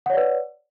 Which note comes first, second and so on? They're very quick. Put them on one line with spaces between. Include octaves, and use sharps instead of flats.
F#5 C#5 D5 B4